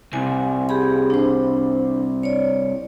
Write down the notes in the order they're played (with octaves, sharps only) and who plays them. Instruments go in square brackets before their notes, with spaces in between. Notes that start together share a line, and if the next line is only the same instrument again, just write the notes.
[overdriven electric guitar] C2 [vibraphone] G#5
[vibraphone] G4 G#4 B5
D4 C5
C#5 D5